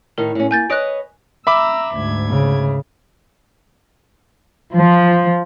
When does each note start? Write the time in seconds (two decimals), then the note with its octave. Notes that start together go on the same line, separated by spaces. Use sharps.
0.18 A2 D#3 A#4
0.35 A2 C#4
0.51 A#3 G#5 G6 A6
0.70 B4 C#5 D#5 F#6 D7
1.47 E5 A#5 B5 D6 E6
1.94 D2 G#2 G#6
2.30 C#3
4.75 F3